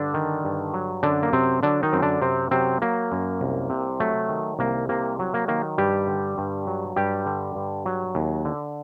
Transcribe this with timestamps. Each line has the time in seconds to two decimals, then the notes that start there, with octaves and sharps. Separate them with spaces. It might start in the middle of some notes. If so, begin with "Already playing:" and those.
Already playing: G2 D3 D4
0.14 D#3
0.44 G2
0.74 F#3
1.03 F#2 D3 D4
1.23 A#3
1.33 C3 F#3 C4
1.63 D3 F#3 D4
1.83 D#3 D#4
1.93 F#2 C4
2.02 D3 D4
2.22 F#2 C3 C4
2.51 C3 F#3 C4
2.82 F#3 A#3
3.12 F#2
3.41 C2
3.70 C3
4.00 F#3 A3
4.29 D#3
4.59 C2 A#3
4.89 C3 A#3
5.19 F#3
5.34 A#3
5.48 D#3 A#3
5.78 G2 G3 G4
6.08 D3
6.38 G2
6.67 F#3
6.96 G2 G3 G4
7.26 D3
7.55 G2
7.85 F#3
8.15 D#2
8.45 D3